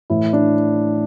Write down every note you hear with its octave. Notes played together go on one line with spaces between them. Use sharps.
A2 E3 E4
D4